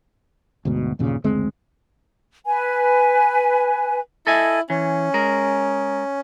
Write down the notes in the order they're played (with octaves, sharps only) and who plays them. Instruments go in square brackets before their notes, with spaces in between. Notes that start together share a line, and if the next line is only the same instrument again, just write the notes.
[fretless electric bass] D2 G#2 B2
G1 D#2 A#2 C#3
F#1 D2 G#3 C4
[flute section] B4 G#5
[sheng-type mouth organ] E4 [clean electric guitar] A4 D#5 G#5
[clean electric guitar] E3 [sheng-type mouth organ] C#4
[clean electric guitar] G#3 A#4